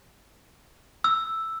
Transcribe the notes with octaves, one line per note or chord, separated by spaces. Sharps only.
E6